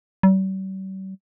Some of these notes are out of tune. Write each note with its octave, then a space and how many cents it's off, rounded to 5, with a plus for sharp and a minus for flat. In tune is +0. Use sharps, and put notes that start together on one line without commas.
G3 -45